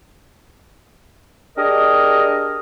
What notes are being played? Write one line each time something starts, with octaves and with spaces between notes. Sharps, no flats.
D4 G4 G#4 A#4 D#5